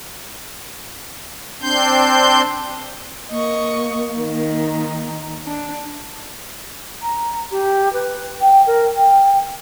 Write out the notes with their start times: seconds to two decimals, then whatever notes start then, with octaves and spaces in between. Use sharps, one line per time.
1.62 C4 D4 C6 G6
3.31 A#3 D#5 C#6
4.18 D#3 D#4
5.46 D4
7.01 A#5
7.51 G4
7.92 B4
8.41 G5
8.66 A#4
8.95 G5